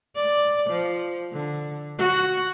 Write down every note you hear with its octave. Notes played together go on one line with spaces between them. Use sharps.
D5
F3
D3
F#4